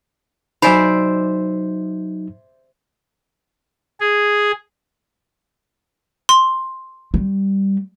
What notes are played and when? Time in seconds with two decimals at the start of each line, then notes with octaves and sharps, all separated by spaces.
0.62 F#3 D#4 C5 D5 E5 G#5 B5
4.00 G#4
6.29 C6
7.14 G3